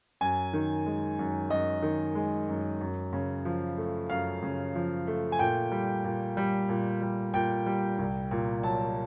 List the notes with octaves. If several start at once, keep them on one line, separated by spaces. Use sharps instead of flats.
F#2 G#5
D#3
G#3
F#2
F#2 D#5
D#3
G#3
F#2
F#2
C#3
F3
A3
F#2 F5
C#3
F3
A3
G#5
A#2 G5
G3
A#2
G3
A#2
G3
A#2 G5
G3
C2
A#2
F#3 A5